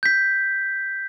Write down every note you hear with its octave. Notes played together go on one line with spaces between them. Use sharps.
G6 B6